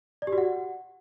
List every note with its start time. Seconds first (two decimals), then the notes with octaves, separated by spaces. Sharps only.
0.22 D5
0.27 G4
0.32 F#4
0.38 F#5